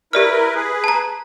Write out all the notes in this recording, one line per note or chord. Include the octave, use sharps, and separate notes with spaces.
E4 G4 A#4 B4 D5 F6
G#4 B4
A5 A#5